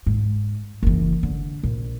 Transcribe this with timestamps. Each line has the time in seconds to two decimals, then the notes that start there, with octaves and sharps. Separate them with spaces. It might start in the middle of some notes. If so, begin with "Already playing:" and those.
0.06 G#2
0.83 F#1 E3
1.23 D3
1.63 A#1